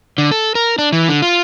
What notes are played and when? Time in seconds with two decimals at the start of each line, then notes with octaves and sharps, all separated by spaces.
0.18 D3
0.31 A4
0.55 A#4
0.78 D4
0.93 E3
1.08 D3
1.22 F4